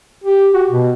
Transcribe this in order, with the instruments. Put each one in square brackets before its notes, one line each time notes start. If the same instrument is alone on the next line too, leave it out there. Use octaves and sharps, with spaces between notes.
[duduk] G4
F#4
B2